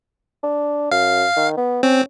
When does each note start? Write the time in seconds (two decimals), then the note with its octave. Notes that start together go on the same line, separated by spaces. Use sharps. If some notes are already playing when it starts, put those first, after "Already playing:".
0.44 D4
0.91 F#2 F5
1.36 D#3
1.57 B3
1.83 C4 C#4